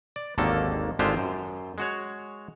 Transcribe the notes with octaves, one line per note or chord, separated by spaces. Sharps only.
D5
G#1 D#2 D3 D#3 A#3 A4
G#1 D3 G#3 F4 G4 C5
F#2
G#3 F#4 C#5